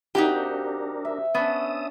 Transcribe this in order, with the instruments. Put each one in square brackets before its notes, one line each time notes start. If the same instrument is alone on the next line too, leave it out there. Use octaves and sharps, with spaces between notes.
[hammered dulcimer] C3 F5 [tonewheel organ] D4 A#4 [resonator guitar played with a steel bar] D#4 F#4 G4
[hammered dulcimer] E5
[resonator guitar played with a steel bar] B3 [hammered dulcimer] C#4 D4 [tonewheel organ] E5 D#6